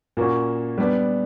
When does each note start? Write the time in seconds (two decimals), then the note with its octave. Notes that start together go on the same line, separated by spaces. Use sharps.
0.17 A#2 A#3 C#4 F#4
0.78 G3 B3 D4